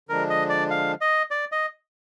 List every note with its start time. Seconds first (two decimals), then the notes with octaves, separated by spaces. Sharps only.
0.09 D3 F3 G#3 D4 A#4
0.30 D#5
0.50 D5
0.70 F5
1.01 D#5
1.31 D5
1.52 D#5